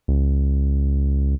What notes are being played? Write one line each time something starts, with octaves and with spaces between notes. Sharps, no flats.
C#2